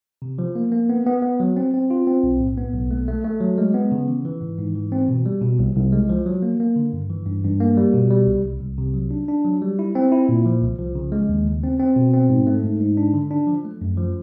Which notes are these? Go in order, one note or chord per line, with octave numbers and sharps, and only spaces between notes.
C3
F3
A#3
A#3
B3
B3
B3
F#3
C4
C4
F4
C4
B1
A2
B3
B1
A3
A3
A3
F#3
G#3
B3
C#3
E3
E3
G#2
G#2
E3
C4
B2
G3
B2
C2
C2
G#3
F3
F#3
A#3
A#3
D3
G2
E3
G2
G2
A#3
G3
B2
G3
C2
C2
C2
C3
F#3
D4
D4
F#3
G3
E4
C4
E4
A#2
F3
C2
F3
C#3
G#3
D#2
C#3
C4
C4
B2
C4
G#2
A3
G#2
G#2
D4
D3
D4
F3
A3
F#2
F3